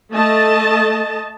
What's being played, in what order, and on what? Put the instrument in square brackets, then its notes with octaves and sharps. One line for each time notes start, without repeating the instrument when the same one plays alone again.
[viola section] A3 D#5 A5